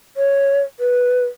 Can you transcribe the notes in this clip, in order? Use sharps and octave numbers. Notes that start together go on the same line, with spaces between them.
C#5
B4